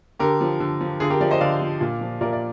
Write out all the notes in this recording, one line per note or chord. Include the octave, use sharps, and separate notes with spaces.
D3 G4 A#4
F3
D3
F3
D3 F4 G#4
G4 A#4
F3 A#4 D5
C5 D#5
D3 D5 F5
F3
A#2
F3
A#2 A#4 D5
D5